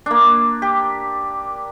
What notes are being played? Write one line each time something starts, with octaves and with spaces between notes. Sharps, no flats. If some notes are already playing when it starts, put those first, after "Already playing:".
A#3 D4
G4